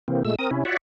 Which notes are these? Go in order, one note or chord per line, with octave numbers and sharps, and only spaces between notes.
C3 E3 A#3 C4
A#2 G#3 A3 E6
C4 A#4 D#6
C3 C#4 E4
F4 F#4 C#5 D5 E5 F#5